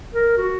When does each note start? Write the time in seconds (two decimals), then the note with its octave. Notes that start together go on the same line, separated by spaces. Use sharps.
0.14 A#4
0.38 F#4